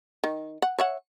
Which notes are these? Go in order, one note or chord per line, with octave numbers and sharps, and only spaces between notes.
D#3
F#5
C#5 E5 F#5